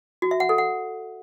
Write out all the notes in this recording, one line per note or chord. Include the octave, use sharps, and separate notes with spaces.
F#4
E5
F#5
A4
F#5